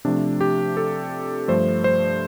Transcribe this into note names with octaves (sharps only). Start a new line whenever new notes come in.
C3 F3 A3 D4
G4
A4
G2 F3 A3 C5
C5